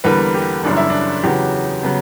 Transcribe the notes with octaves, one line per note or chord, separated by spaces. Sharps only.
E2 D3 G3 A#3 B4
G4
F#1 F#2 C#3 E3 G3 D4
E4
D4
E2 C#3 F#3 B3 G4
C#3 F#3 B3